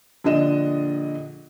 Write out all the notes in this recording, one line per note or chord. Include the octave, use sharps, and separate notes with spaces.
A#1 D3 D4 D#5 E7